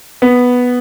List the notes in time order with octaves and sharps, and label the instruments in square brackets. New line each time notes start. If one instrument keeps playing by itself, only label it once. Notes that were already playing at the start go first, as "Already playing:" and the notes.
[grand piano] B3